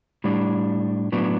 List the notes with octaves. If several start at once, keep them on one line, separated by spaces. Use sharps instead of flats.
A2 G3 D4
A2 F#3 B3 D4